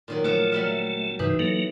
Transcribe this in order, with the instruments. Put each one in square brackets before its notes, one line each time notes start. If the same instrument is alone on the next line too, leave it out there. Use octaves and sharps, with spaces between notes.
[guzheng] A#2 D#3 F#3
[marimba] D3 [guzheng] F3 F#3 [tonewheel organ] A3
[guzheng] F#3 G3 E5 [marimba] F6
[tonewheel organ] G2 C3 [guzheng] E3 [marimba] D#4 B4
[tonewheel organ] F#3 A#3 [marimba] A4